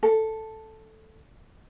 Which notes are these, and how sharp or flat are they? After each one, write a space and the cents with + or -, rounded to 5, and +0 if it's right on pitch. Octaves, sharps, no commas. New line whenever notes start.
A4 +0